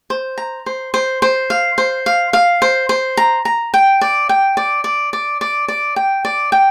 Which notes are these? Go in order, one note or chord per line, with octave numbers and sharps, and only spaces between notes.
C5
A#5
C5
C5
C5
F5
C5
F5
F5
C5
C5
A#5
A#5
G5
D5
G5
D5
D5
D5
D5
D5
G5
D5
G5